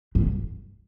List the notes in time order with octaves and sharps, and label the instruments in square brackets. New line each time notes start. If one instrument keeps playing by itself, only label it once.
[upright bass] G2